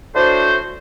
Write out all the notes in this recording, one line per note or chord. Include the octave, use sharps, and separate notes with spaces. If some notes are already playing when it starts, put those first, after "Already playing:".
A2 D4 F#4 C5